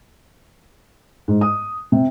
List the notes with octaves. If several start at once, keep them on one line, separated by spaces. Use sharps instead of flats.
G#2
D#6
C3